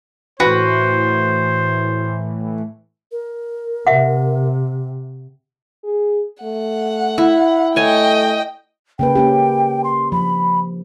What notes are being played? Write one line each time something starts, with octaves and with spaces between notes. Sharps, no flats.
A2 E3 F#4 B4 C5
A#4
C3 E5 F#5
G#4
A3 F#5
E4
A3 C#5 D#5 G5 G#5
C#3 A#3 B4 G5
A#3 C#4 G4
C6
F3 B5